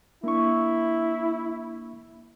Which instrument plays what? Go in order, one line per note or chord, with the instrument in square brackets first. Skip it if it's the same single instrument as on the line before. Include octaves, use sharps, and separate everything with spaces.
[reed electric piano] A#3 D4 C#6 [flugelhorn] E4